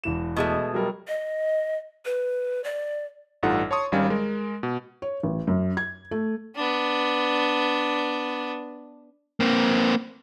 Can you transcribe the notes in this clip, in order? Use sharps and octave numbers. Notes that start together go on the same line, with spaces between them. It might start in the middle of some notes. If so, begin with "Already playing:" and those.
E1 E3 E7
B2 G#3 A3
F#3 G3 A#4
D#5
B4
D5
A1 G2 D#4 F4 A4 F#5
C#5 A5 C6 C#6 D#6
G#1 D#3 G3 C#4 F5
G#3 A#4
B2
C#5
A1
F#2
G#6
A3
B3 D4
A#3 C4